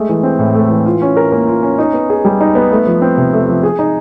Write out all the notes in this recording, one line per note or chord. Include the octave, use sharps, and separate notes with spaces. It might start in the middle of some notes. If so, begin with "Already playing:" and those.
Already playing: G#3 A3
E3
C4
A2
A3
E3
F4
C#4
A#4
A#3
F4
C#4
D#4
B3
G#4
G3
D#4
B3
A3
F3
C4
C3
A3
F3
G#4
D#4